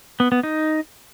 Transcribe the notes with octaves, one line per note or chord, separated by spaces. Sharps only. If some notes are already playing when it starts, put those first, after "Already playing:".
B3
B3
D#4